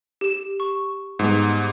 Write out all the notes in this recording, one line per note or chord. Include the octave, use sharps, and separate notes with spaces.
G4 E7
C#6
G#2 G3 B3